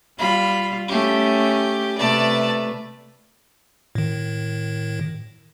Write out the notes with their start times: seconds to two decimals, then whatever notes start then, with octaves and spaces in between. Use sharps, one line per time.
0.19 G3 F4 B5
0.88 A3 C#4 G4
1.98 C3 A3 B4 D5 A5
3.95 A2 D#3